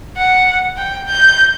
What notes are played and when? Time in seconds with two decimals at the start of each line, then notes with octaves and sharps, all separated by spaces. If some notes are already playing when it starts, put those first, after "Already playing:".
0.17 F#5
0.77 G5
1.07 G6